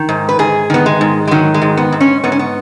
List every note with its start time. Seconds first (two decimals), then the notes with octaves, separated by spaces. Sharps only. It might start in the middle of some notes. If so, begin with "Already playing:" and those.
Already playing: D#3
0.09 G#2
0.29 B4
0.39 G#2 G#4
0.70 D#3 B3
0.86 G#3
1.01 G#2
1.27 G#3
1.31 D#3 F#3
1.54 G#3
1.62 G#2
1.77 B3
1.92 G#2
2.01 C#4
2.24 G#2 B3
2.32 C#4
2.39 B3